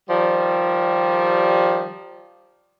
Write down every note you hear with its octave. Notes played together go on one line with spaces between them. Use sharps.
D#3 F3 G3